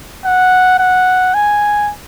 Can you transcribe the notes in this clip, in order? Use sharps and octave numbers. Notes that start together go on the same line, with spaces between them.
F#5
F#5
G#5